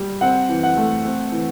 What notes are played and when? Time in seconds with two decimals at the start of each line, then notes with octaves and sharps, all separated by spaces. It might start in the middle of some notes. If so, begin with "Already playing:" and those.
Already playing: G3
0.21 C4 F#5
0.49 E3
0.63 F#5
0.77 A3
1.04 C4
1.32 E3